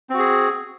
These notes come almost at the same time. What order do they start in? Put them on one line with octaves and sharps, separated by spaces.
C4 F#4 G#4